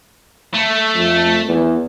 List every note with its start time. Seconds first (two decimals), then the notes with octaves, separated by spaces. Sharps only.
0.54 A3
0.95 F2
1.48 E2